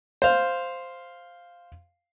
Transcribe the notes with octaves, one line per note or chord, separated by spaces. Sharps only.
C5 F5